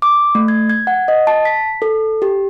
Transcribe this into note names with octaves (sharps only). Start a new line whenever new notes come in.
D6
A3
G#6
G#6
F#5
D#5
A5
B6
A4
G4